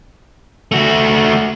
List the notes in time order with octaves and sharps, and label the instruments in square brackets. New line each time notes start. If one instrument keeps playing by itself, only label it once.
[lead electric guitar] A3 F#4